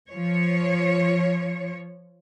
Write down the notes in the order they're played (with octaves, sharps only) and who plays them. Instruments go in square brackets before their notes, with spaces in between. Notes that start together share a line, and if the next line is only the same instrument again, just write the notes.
[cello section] F3 C#5